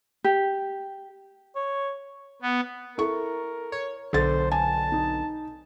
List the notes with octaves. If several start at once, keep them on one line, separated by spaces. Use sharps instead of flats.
G4
C#5
B3
E4 A4 A#4 C#6
C#5
B1 D3 A4 C5 A6
G#5 A5
D#4